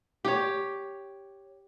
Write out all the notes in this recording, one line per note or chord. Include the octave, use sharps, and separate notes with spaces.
G4 C#5